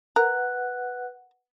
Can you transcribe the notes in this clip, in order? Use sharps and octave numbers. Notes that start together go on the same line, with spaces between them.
A#4 B4 F#5 F#6